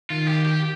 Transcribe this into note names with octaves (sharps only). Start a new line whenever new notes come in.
D#3 F4
G4
G4